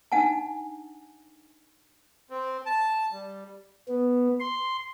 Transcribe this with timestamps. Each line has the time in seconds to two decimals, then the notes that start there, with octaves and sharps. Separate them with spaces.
0.12 D4 D#4 F#5 G#5 A5
2.30 C4
2.66 A5
3.12 G3
3.88 B3
4.40 C6